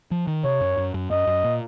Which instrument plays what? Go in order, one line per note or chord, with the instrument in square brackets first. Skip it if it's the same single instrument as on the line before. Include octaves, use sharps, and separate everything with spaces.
[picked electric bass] F3
D#3
[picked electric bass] C3 [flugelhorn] C#5
[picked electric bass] F#2
F#2
F#2
[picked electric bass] F#2 [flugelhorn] D#5
[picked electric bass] F#2
A#2